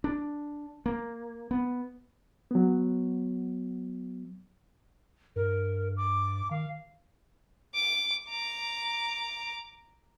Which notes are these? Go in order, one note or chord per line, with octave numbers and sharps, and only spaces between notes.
D4
A#3
B3
F#3 B3
G2 A#4
D6
D#3 F5
D6
A#5 D6